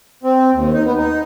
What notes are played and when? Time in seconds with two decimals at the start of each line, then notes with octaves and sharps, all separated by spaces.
0.23 C4
0.53 D#2
0.73 D#4
0.85 B3
0.97 D#4